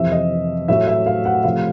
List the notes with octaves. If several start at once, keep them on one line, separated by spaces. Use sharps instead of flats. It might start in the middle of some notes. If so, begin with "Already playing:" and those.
Already playing: F2 C3 E3 E5
D#5
A2 F#3 A3 E5
E5
F5
F#5
C3 F3 A3 F5